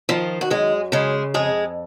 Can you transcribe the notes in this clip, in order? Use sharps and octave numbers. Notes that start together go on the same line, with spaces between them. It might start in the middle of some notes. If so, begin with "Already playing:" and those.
D#3 F3 F4
F#4
F#2 G#3 G#4
C#3 G#3 G#4
F2 G#3 G#4